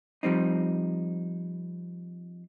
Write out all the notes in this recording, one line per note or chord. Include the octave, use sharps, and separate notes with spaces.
F3 G3 C4 D#4